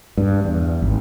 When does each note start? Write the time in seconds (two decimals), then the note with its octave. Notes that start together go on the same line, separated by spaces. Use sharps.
0.17 G2
0.44 E2
0.82 G#1